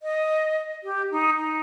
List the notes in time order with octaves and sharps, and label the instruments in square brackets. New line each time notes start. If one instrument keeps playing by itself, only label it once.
[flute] D#5
G4
D#4
D#4